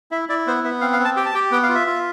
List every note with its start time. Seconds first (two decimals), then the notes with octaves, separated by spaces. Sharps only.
0.11 E4 E5
0.29 E4 D5
0.47 B3 C5
0.64 B3 E5
0.81 C4 F5
0.93 F5
0.99 C4
1.05 A5
1.16 G4 G5
1.26 A5
1.34 G4 G5
1.51 B3 G5
1.63 F5
1.69 F4
1.75 E5
1.87 F4